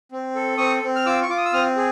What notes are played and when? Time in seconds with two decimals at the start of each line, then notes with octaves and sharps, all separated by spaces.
0.12 C4
0.35 A4
0.58 C4 C#6 D#6
0.83 C4
0.96 F6
1.05 F4 D6 E6
1.22 C#6
1.29 F4 D6
1.38 D#6
1.45 E6
1.53 C4 D#6 F6
1.76 G#4